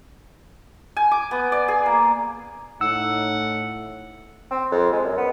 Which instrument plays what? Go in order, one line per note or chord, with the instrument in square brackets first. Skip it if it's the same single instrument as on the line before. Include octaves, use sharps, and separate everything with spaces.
[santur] G#5
D6
B3
D5
G#4
A#3
[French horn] A2 [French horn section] D#4 [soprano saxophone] F#5 [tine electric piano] E6
[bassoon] C4
F2
G#3
F#2
B3